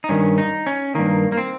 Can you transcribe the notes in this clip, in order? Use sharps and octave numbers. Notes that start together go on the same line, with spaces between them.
D#4
G2 D#3 C#4
D#4
C#4
G2 D#3 A#3
A#3
C4